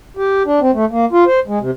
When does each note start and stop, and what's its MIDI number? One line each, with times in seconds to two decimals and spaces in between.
0.17 0.43 67
0.46 0.60 62
0.61 0.71 60
0.74 0.85 57
0.91 1.05 58
1.12 1.24 65
1.27 1.40 72
1.48 1.59 56
1.61 1.71 48